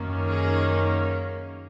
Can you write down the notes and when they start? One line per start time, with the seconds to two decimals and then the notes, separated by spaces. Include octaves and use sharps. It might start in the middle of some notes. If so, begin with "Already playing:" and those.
Already playing: F#2 D#3 A#3 C#4
0.27 G#4